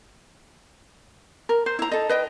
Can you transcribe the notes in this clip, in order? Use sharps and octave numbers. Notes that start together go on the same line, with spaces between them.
A#4
C5
E4 A#5
A4 D#5
B4 D#5 G5